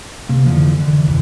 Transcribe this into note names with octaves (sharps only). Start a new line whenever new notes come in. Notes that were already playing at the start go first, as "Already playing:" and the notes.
C3 A#3
F2 D3 E3 F3
D3 E3
F#1 D#2 C3 E3